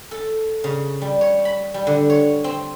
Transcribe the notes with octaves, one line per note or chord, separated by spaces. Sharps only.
A4
C#3
G3
C#5
B5
G3
D3
C#5
C4